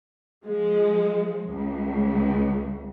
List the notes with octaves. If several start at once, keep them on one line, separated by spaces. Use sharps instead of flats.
F3 G#3
C#2